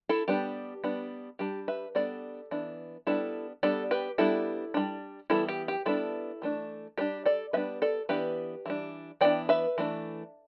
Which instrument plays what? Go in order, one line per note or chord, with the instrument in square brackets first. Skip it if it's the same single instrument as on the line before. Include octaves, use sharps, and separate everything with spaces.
[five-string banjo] E4 A4
G3 B3 D4 G4
G3 B3 D4
G3 D4 G4
B4 E5
G3 B3 D4 A4 D5
E3 B3 D4
G3 B3 D4 E4 A4
G3 B3 D4 A4 D5
G4 B4
G3 B3 D4 E4 A4
G3 D4
E3 G3 B3 E4 A4
G4
G4
G3 B3 D4 E4 A4
E3 A3 D4
G3 D4 G4 B4
A4 D5
G3 B3 D4 B4 E5
A4 D5
E3 B3 D4 G4 B4
E3 G3 D4
E3 B3 D4 D5 G5
B4 E5
E3 A3 D4